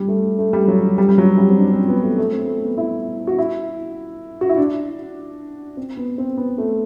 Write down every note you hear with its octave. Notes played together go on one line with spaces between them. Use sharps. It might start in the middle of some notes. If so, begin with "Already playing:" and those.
Already playing: G3
A3
A3
G3
F#3
G3
G3
F#3
G3
C4
D4
C4
B3
A3
A3
C4
A3
B3
E4
F#4
E4
F#4
E4
D4
C4
B3
C4
B3
A3